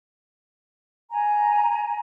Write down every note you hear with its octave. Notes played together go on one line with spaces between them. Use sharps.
G#5 A#5